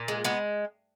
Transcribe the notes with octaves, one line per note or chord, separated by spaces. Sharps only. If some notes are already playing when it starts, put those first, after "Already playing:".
Already playing: A#2
G#3
G#3 B3